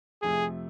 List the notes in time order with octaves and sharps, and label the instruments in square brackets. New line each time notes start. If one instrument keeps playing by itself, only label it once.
[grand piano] F2 C3 F3 A3 [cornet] G#4